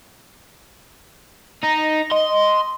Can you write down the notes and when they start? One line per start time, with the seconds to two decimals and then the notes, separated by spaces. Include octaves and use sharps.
1.63 D#4 A#6
2.12 D#5 C6